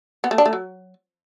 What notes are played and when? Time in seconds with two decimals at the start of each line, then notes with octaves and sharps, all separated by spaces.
0.24 B3
0.31 A3
0.38 D4
0.46 A3
0.53 F#3